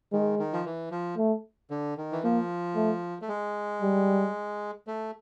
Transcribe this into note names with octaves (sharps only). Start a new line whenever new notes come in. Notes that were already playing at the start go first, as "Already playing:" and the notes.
D#3 G#3
D#3
F3
E3
F3
A3
D3
D#3
E3
F3 A#3
A3
A3
G#3
G3
A3